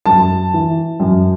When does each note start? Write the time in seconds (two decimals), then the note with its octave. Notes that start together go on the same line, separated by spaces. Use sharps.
0.06 F#2 A5
0.54 E3
1.00 F#2